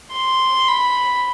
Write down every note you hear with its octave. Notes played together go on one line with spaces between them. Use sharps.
C6
B5